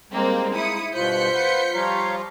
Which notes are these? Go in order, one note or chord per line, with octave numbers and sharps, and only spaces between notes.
G3 G#3 A#3 C4 D#4
E4 D#6 C#7
G2 B2 F4 C5 F#6 G6 B6 C#7
B4 F#5
F3 G3 F4 C#5 F5 A#5